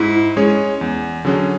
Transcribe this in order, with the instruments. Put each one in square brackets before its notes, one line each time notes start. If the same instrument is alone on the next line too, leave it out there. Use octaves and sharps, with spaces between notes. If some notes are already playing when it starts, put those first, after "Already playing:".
Already playing: [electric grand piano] G#2 [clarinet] E4
[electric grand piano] G#3 C#4 G#4 C#5
E2
D3 F#3 C#4 G#4